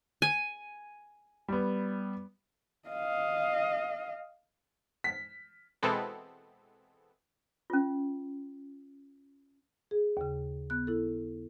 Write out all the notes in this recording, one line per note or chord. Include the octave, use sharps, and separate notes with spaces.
G#5
G3 B3
D#5 F5
B6
B2 E3 G#3 B3 C4 A4
C#4 F4
G#4
D#2 C#3
B3 F#6
E4 A4